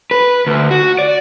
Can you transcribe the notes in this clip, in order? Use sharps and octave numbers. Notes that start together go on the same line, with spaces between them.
B4
D2
F#4
D5